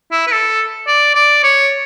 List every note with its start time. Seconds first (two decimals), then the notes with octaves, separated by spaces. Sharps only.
0.12 E4
0.27 B4
0.32 A4
0.87 D5
1.15 D5
1.44 C#5